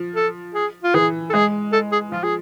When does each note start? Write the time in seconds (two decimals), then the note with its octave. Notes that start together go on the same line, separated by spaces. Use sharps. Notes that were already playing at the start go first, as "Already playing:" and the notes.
Already playing: F3
0.16 A4
0.55 G#4
0.83 F4
0.94 E3 G#4
1.30 A4
1.33 G#3 G#4
1.73 A4
1.92 G#4
2.12 F3 F4
2.24 G#4